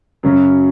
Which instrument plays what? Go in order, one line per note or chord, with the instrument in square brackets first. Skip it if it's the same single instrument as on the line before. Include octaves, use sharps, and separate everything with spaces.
[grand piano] F#2 C#3 F#3 C#4